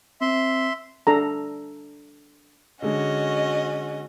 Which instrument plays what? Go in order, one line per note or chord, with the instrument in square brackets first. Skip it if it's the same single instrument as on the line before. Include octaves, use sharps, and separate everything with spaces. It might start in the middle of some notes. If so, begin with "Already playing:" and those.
[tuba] C4 [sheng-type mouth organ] E5 C6
[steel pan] D4 A4 A#5
[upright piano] D3 G#3 [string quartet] C#4 F#4 D#5